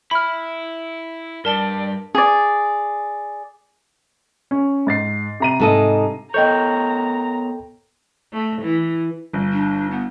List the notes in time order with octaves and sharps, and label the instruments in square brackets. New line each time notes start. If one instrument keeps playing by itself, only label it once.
[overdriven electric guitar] E4 [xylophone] B5 F6
[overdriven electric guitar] G2 [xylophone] A#4 A5 G7 [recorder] D5
[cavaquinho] G#4 D5
[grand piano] C#4
G#2 A6 C7
C3 A#5 D#7
[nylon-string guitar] G#2 A4 D#5
[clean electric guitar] B3 A#4 C#5 [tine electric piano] A4 G5 [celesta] D#5 G6 [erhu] A#5
[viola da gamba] A3
E3
[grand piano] G1
[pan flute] D4
B3